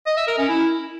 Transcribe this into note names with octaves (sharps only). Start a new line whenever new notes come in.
D#5
E5
A#4
C#4
E4